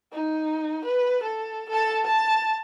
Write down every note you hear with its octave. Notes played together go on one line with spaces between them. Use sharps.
D#4
B4
A4
A4 A5
A5